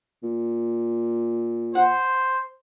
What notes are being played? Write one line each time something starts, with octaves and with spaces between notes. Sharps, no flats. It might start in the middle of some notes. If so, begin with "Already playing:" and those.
A#2
C5 F#5